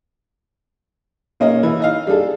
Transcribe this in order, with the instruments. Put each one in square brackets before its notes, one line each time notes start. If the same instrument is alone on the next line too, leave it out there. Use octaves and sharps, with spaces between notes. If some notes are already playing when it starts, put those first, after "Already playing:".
[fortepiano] B1 A#3 C#4 D#5
E3
D#4 D#5 F5
G3 D4 G#4 A4